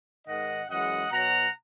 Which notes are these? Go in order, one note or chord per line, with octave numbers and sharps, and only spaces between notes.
G#2 D#3 G#3 D#5 F#5
F#2 E3 G#3 D#5 F#5
B2 F#3 F#5 A#5